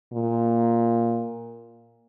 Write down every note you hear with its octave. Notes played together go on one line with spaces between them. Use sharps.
A#2